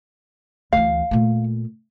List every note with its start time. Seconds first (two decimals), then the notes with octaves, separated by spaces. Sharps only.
0.73 D2 E3 F5
1.11 A#2 A3